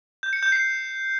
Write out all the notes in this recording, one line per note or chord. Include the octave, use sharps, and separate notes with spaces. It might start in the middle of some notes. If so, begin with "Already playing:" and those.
G6
C#7
G6
C7